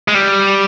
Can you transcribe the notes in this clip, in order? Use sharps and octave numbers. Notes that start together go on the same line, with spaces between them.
G#3
G3